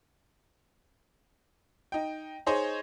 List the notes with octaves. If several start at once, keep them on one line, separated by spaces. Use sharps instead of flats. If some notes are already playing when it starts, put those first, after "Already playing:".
D#4 G5
D#4 G#4 C5 C#5 D#5